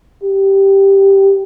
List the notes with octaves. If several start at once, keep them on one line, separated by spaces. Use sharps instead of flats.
G4